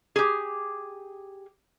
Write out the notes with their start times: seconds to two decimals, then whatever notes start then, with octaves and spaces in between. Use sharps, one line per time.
0.16 G4 G#4